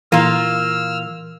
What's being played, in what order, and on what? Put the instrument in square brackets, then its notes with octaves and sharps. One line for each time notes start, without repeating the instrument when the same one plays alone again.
[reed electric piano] A#2 E3 [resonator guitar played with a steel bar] A#3 F4 [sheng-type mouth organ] E6 F6